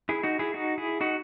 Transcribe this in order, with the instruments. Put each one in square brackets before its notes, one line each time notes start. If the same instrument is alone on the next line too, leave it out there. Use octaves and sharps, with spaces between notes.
[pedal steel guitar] E4 G#4
D#4 F#4
E4 G#4
D#4 F#4
E4 G#4
D#4 F#4